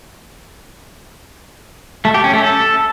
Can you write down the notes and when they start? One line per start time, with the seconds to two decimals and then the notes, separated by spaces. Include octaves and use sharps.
2.05 A3
2.14 G4
2.24 C#4
2.34 A3
2.43 A4